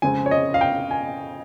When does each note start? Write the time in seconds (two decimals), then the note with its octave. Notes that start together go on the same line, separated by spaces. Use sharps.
0.02 F2 C#3 G#3 C4 G#5
0.26 C#5
0.31 D#5
0.54 F5
0.61 G5
0.91 G#5